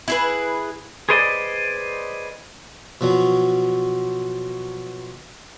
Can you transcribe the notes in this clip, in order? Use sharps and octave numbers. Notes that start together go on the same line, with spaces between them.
E4 G#4 B4
G#4 B4 C5 D5 D#5
B2 F3 F#3